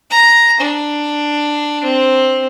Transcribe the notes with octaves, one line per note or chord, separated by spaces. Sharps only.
A#5
D4
C4